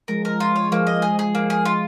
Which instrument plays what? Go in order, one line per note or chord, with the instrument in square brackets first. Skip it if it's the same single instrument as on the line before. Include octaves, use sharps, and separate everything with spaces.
[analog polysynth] F3 G#3 [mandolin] A#4
[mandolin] A#4
F4
C#5
[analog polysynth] F3 G#3 [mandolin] A#3
[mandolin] D#5
G#4
G#4
A#3
G#4
F4